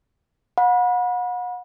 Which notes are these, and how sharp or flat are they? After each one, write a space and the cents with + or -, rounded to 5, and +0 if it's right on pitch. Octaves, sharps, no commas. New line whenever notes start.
F#5 -40 B5 -30